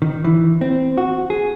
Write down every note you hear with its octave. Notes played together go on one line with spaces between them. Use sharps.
D#3
E3
C4
F#4
G#4